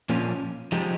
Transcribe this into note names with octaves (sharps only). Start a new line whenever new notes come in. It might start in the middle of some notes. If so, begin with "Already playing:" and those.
A#2 F3 A#3 C#4
F3 G#3 D#4 G4